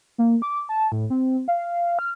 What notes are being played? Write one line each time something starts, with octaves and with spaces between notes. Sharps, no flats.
A#3
D6
A5
A2
C4
F5
F6